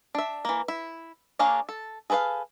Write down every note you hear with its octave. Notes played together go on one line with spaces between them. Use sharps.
D4 E5
E3 A#3
E4
A#3 D4 G#4 C#5 F5
A4
G#4 A4 B4 C#5 F5